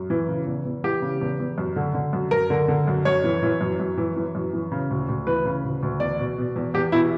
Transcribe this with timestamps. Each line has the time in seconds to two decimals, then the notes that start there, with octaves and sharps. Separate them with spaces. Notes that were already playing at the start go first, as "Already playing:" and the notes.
Already playing: F#2
0.10 E3
0.29 C#3
0.47 E2
0.65 E2
0.84 E3 G4
1.02 C#3
1.21 E2
1.39 E2
1.58 F#2
1.76 D3
1.94 D3
2.13 F#2
2.31 F#2 A#4
2.50 D3
2.68 D3
2.87 F#2
3.05 F#2 C#5
3.24 E3
3.42 E3
3.61 F#2
3.80 F#2
3.97 E3
4.16 E3
4.35 F#2
4.53 E3
4.72 C#3
4.90 D2
5.09 D2
5.27 E3 B4
5.45 C#3
5.64 D2
5.83 D2
6.00 E2 D5
6.19 B2
6.38 B2
6.56 E2
6.74 E2 G4
6.92 B2 E4